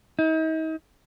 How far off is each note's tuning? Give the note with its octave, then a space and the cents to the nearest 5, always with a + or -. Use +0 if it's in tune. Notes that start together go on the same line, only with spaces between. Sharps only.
D#4 +40